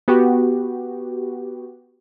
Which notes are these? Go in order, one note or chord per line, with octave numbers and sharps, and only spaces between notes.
B3 F#4 G4